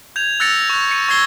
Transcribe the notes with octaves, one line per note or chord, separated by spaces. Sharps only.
G6 G#6 F7
E6 F#6 A6 A#6 C#7 F7
C#6 F#6
C#7 D#7
C#6 E6 G#6 C7 G7